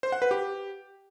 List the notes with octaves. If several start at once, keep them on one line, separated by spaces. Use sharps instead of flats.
C5
F#5
B4
G4